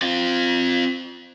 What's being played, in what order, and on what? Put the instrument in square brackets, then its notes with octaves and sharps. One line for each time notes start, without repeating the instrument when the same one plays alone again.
[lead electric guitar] C4 F4